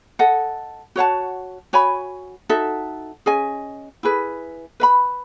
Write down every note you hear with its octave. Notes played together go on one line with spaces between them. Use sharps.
A4 D#5 F#5
F#4 C#5 F#5 A5
F#4 C#5 G#5 B5
D#4 F#4 A4 E5
C#4 G#4 D#5 G#5
E4 G#4 B4
B4 E5 B5